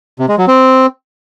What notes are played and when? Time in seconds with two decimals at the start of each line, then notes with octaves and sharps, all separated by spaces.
0.19 C3
0.29 G#3
0.38 F#3
0.48 C4